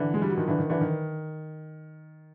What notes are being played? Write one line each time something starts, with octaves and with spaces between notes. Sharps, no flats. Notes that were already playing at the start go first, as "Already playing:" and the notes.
Already playing: D3 E3
G#3
G3
F#3
D#3 F3
D3 E3
D#3
D3 E3
D#3